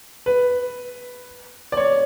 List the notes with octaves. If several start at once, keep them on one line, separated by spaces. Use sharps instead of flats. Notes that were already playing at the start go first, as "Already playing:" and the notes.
B4
D5
C#5